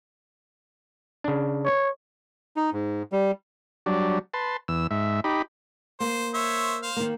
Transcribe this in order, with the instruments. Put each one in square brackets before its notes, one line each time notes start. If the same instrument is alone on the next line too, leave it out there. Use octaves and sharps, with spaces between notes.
[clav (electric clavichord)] C#3 D4
[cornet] C#5
[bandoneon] D#4
G#2
G3
[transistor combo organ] F#3 G3 D4
B4 A5 C6
E2 E6
G#2 E5
D#4 G4 B5
[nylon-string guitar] A#3 [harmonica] C5
[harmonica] C5 C#5 E5
C5 F5
[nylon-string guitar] D#3 A#3